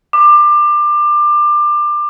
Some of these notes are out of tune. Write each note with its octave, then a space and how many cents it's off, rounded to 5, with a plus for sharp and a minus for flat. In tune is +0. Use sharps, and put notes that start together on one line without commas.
D6 +25